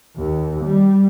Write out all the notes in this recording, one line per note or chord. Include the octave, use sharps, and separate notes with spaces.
D#2
G3